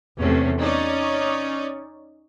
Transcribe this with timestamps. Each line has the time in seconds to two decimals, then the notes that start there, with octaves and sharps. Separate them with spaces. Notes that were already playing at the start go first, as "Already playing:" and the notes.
0.19 E2 C3 A3 C#4
0.59 C#4 D#4 C#5 D5